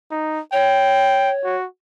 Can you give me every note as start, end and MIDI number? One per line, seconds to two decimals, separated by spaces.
0.11 0.40 63
0.53 1.55 73
0.53 1.32 79
1.44 1.66 66